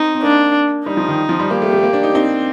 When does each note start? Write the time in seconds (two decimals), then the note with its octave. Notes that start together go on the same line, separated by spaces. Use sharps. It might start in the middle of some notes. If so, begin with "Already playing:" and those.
Already playing: C4 D#4
0.15 C4
0.23 A#3 D4
0.86 G3 D#4
0.97 F3
1.08 D#3
1.29 F3
1.39 G3
1.50 A#3 G4
1.62 A3
1.72 A3
1.83 A#3
1.93 D4
2.03 D#4
2.15 C4 D#4